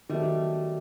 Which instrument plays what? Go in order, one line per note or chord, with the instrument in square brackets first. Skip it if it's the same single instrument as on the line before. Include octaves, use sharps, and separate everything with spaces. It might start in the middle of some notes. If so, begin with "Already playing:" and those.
[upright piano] D#3 F#3 B3 [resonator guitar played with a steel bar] G3 A3